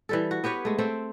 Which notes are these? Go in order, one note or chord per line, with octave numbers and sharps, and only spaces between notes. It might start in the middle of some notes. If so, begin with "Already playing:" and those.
E3 G3 A4
F#4
B3 G4 B4 C#5
G#3 A3
A3 C4 C5 G5